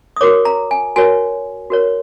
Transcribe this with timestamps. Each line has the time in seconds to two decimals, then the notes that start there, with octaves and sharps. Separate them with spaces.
0.16 D#6
0.21 F#4 A#4 C#5 D6
0.45 A#5
0.71 G#5
0.96 F#4 A#4 C#5 G#5
1.70 F#4 A#4 C#5